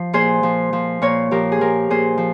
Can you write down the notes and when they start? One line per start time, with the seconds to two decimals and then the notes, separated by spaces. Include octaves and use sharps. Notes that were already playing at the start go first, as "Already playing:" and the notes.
Already playing: F3
0.13 A#2 G#4 C5
0.43 F3
0.73 F3
1.02 A#2 A#4 C#5
1.31 F3 G4 A#4
1.52 G#4
1.61 F3 G4 A#4
1.90 A#2 G#4 C5
2.18 F3